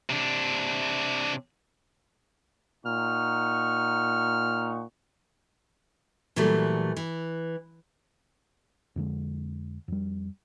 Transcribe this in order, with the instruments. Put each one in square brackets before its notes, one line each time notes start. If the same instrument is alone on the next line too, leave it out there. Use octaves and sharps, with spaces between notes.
[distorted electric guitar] C3 D4
[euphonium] A#2 [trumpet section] D#4 F#5 C#6 [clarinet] F6
[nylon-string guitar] A#2 E3 F#3 G3 A3
E3
[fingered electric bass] F2 D3 G#3
F2 G3